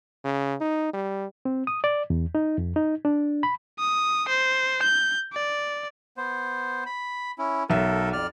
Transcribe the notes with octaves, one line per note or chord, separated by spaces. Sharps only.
C#3
D#4
G3
C4
D#6
D5
E2
D#4
F2
D#4
D4
B5
D#6
C5
G6
D5
B3 C5
B5
C#4 E4
B1 A4 A#4 E5
F2 D5 F6